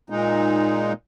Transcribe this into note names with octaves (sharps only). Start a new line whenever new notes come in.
A#2 G#3 D#4